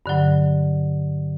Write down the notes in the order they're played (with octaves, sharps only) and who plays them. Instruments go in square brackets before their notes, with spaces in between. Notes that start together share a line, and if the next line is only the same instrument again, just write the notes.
[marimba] G2 D3 F#3